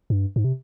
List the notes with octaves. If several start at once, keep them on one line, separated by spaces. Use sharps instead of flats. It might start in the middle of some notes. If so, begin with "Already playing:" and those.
G2
G#2
C3